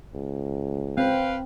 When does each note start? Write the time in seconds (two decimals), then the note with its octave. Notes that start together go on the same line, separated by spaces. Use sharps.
0.14 C#2
0.98 C4 B4 F5 G5